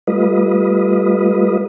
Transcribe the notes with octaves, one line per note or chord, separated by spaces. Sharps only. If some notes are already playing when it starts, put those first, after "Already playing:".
G3 A3 F4 B4 D#5